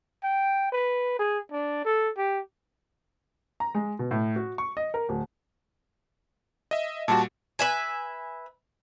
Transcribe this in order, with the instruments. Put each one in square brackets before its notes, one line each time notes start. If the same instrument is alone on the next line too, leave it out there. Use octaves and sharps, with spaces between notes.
[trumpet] G5
B4
G#4
D4
A4
G4
[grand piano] A#5
G#3
B2
A2
F#4
C#6
D#5
A#4
D1
[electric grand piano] D#5 E5
[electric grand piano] A#2 G3 F#4 [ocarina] A5
[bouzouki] B4 E5 G#5